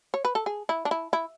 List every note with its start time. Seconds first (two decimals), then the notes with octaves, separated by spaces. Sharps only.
0.14 C#5
0.25 B4
0.35 A4
0.46 G#4
0.69 E4
0.85 D4
0.91 E4
1.13 E4